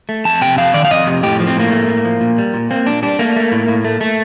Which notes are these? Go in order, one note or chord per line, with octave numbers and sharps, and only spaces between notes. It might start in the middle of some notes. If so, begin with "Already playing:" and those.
A3
F2 A5
C3 G5
F2 F5
D#3 D5
F5
F2 D#5
C3
A2 G4
F3
C4
A2 A#3
A3
A2
F3
A#2
G3
A#2
A#3 C4
A#2 D4
G3 D4
A3 A#3
A3
A2
A2
A3
A3